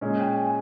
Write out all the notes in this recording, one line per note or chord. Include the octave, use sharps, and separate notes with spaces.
A#2 G#3 C#4
G5
G#5